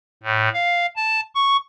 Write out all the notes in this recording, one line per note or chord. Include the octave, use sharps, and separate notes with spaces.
A2
F5
A5
C#6